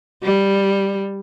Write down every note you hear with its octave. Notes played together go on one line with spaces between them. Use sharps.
G3